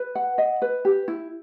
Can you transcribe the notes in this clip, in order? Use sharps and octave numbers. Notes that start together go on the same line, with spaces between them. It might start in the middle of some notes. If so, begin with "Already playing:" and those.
Already playing: B4
F#5
D#5
B4
G4
E4